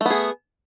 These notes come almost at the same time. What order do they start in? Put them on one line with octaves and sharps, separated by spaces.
A3 B3 G#4